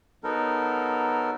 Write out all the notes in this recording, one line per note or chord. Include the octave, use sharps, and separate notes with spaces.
F#3 B3 D#4 A4 A#4